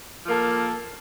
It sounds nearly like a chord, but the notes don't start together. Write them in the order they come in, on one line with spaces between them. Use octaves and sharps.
F3 A#3 A4